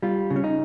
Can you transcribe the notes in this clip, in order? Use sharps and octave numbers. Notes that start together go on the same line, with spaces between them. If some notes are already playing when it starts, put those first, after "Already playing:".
G3 F4
C#3
C#4
D#4